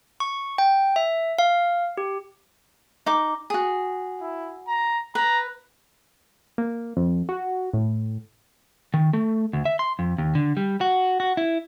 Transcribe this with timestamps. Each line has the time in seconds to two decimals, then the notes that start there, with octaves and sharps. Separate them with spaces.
0.20 C#6
0.58 G5
0.96 E5
1.39 F5
1.97 G4
3.06 D#4 D6
3.50 F#4 G#4
4.21 E4
4.68 A#5
5.15 B4 A#5
6.58 A#3
6.97 F2
7.29 F#4
7.73 A2
8.94 D#3
9.13 A3
9.53 D2
9.65 E5
9.79 C6
9.99 F2
10.18 D#2
10.35 D3
10.57 G3
10.81 F#4
11.20 F#4
11.37 E4